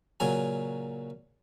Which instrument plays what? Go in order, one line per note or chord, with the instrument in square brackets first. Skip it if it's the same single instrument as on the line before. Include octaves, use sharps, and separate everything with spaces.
[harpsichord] A#2 C#3 F#3 G#5 A#5